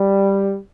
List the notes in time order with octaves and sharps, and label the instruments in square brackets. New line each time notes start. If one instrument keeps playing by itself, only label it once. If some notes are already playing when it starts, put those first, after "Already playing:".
Already playing: [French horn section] G3